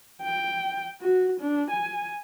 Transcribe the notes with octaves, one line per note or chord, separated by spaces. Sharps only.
G5
F#4
D4
G#5